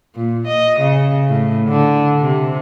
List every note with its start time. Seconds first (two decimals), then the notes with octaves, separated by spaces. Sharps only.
0.15 A#2
0.47 D#5
0.80 C#3
1.29 A2
1.69 D3
2.21 C3